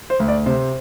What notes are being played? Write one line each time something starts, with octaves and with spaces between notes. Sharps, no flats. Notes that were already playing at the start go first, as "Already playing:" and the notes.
C5
D2
D5
C3 C5